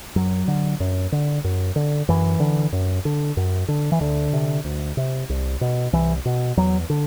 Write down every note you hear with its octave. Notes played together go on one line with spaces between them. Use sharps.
F#2 F#3
D3
F#2
D3
F#2
D3
F#2 E3
D3
F#2
D3
F#2
D3
E3
D2 D3
C3
D2
C3
C2
B2
C2 E3
B2
E2 F#3
D3